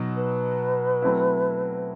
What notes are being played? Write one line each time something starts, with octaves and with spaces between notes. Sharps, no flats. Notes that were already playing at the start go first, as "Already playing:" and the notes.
Already playing: B2 F#3 D#4
B4
F#3 A3 C4 E4